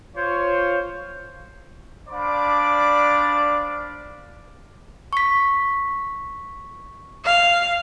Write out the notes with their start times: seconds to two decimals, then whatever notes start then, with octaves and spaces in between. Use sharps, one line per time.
0.16 F4 C5 C#5
2.09 D4 C5 D5 F5 B5 D6
5.13 C#6 B6
7.25 F5